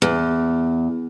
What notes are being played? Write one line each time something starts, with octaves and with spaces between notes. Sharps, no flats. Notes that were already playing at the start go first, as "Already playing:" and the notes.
E2